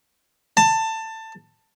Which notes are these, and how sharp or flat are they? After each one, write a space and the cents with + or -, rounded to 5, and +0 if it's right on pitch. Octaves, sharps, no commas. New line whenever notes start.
A5 +20